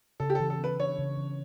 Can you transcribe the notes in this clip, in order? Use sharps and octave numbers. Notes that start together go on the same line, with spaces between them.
C#3 A4
G4
E3 A4
A4
B3 B4
D4 C#5
C#3
E3